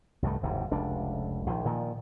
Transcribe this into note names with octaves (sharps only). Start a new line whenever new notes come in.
C2 G2 D#3 A3
F#1 D#2 G#2 C3
F1 C#2 D4
A#1 D#3 F3
A#2 D#3 F3